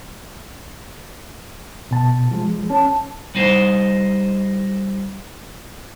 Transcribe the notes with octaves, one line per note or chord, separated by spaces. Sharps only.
B2 A5
F3 G#3
C#4 A5
G3 D#4 C5